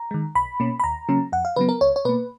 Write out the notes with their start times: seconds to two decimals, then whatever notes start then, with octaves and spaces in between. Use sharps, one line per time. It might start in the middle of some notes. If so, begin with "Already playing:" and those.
Already playing: A#5
0.11 D#3 G#3
0.35 B1 B5
0.60 B2 A#3 C#4
0.80 B5
0.84 D#2 A#5
1.09 C#3 F#3 A#3 C#4
1.32 F2 F#5
1.45 F5
1.56 C#3 F#3 B3 B4
1.69 A#4
1.81 C#2 C#5
1.96 C#5
2.05 B2 A#3 B4